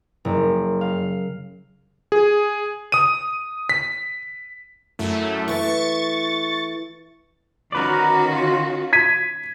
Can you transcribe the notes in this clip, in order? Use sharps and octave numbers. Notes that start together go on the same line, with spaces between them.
F#1
F5
G#4
D#6 D#7
B6
F#2 A3 E4
E3 A3 E4 C#6 A6
D#3 C#4 F#4 A#4 B4 D5
F4
G#6 B6 D#7